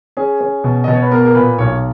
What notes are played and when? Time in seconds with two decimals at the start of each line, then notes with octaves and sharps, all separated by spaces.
0.17 C#4 G#4
0.41 C#4
0.64 B2
0.84 B2 D#5
0.94 C#5
1.02 B4
1.11 B3 A#4
1.25 A#4
1.35 A#2 B4
1.58 B1 C#5